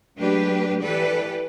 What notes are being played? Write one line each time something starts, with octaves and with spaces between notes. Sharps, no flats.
F#3 G#3 A3 D4 G4 B4
E3 G4 A4 B4 D5